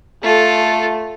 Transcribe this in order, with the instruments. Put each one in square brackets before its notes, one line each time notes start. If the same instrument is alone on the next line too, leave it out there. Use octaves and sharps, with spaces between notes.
[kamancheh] A3 [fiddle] F4 A4